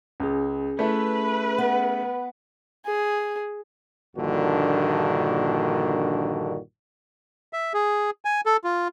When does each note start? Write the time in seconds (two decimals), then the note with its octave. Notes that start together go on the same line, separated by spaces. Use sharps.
0.20 C#2 C#4 G#4
0.79 A3 E4 B4
1.58 B3
2.85 G#4
4.16 A#1 G2 A#2 D3 D#3 F#4
7.53 E5
7.74 G#4
8.25 G#5
8.46 A4
8.64 F4